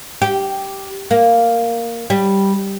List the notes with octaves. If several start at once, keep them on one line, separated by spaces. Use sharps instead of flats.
G4
A#3
G3